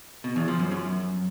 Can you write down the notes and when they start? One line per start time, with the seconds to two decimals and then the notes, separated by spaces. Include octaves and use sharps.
0.24 B2
0.36 E2
0.48 F3
0.60 F#2
0.71 F#2